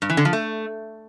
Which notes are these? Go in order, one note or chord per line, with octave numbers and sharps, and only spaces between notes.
G2
E3
D3
F3
A3